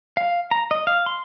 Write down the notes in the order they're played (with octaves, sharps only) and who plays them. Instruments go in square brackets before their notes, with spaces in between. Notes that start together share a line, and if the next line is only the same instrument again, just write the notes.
[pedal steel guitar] F5
A#5
D#5
F5
C6